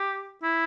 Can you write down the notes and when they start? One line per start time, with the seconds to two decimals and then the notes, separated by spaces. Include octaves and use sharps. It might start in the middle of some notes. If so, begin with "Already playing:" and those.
Already playing: G4
0.43 E4